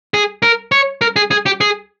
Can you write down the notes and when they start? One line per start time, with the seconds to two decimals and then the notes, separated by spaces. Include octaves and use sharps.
0.14 G#4
0.42 A#4
0.72 C#5
1.01 A#4
1.16 G#4
1.31 G#4
1.46 G4
1.61 G#4